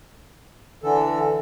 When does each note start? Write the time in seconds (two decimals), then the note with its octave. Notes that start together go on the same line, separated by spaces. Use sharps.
0.83 D3 E3 A4